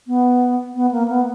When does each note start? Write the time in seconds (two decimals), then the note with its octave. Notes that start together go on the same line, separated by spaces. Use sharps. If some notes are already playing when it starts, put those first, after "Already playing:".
0.07 B3
0.75 B3
0.91 A#3
1.08 B3